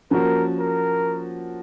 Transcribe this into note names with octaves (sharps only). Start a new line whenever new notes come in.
F3 A#3 C#4 F#4 A#4
A#4